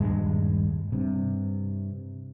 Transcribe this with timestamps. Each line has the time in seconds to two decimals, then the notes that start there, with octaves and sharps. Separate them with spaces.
0.01 D#1 G2 G#3
0.92 G2 C3